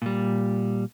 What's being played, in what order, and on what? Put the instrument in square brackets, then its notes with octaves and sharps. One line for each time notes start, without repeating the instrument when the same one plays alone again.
[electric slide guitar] A#2 G3